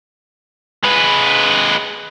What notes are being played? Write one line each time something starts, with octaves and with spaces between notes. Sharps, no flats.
G#3 B4